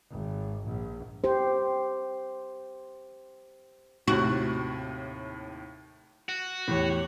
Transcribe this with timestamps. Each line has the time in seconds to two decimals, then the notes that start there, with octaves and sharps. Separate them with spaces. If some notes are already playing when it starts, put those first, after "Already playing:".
0.11 G#1
0.65 A#1
1.24 G4 C5
4.08 D#2 A2 C3 F#4
6.29 F#4
6.68 E2 A2 G4 C#5